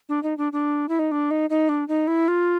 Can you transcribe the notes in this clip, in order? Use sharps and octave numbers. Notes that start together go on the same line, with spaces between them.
D4
D#4
D4
D4
E4
D#4
D4
D#4
D#4
D4
D#4
E4
F4